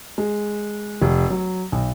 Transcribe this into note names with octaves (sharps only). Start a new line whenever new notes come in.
G#3
F1
F#3
B1